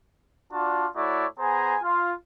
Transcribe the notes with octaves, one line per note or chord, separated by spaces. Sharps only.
D4 F4 F#4 D5 A5
A3 E4 F#4 C#5 D5
B3 G#4 C5 G#5 A#5
F4